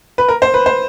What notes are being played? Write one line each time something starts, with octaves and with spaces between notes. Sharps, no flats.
B4
A#4
C5
B4
C5